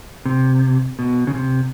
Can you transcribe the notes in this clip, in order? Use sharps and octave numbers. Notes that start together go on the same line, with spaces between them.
C3
B2
C#3
C3